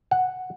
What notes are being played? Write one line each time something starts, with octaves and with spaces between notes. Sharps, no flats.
F#5